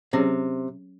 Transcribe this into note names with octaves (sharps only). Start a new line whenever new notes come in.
C3 F#3 C#4 G#4 C#5